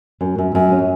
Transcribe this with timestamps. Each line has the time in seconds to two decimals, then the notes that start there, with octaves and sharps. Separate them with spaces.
0.21 F#2
0.38 F#2
0.55 F#2
0.72 C#4